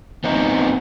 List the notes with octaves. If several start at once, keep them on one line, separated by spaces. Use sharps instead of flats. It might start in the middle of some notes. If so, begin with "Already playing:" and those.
B3 C4 D#4